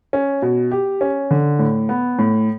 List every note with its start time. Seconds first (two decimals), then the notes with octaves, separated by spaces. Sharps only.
0.13 C#4
0.42 B2
0.71 G4
1.01 C#4
1.31 D3
1.59 A2
1.89 B3
2.19 A2